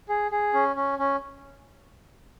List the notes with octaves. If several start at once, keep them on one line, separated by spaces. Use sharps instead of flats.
G#4
G#4
C#4
C#4
C#4